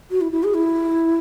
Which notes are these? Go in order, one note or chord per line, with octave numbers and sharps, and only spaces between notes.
F#4
E4
E4
G#4
E4